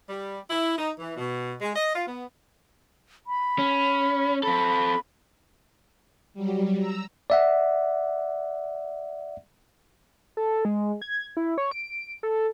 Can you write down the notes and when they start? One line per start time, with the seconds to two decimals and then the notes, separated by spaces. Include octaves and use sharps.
0.09 G3
0.49 E4
0.78 D#4
0.99 E3
1.17 B2
1.60 G#3
1.75 D#5
1.95 F4
2.06 B3
3.27 B5
3.59 C#4
4.43 C4 A4 B5
6.34 F#3 G3
6.78 A#5 E6
7.30 D5 E5 F#5
10.37 A4
10.65 G#3
11.02 G#6
11.37 E4
11.58 C#5
11.71 D7
12.23 A4